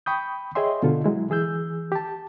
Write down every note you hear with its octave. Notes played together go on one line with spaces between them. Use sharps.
G5 B5 C#6 D#6 G6
G#4 C#5 D#5 E5 G5 C6
B2 D3 F4 A4
F#3 G#3 E4
E3 G#4 E6 G6
G4 A5